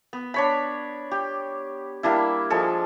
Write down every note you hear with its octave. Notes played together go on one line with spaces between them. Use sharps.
B3
D4 C#5 B5
G4
G3 A#3 D4 E4
F3 G#3 A4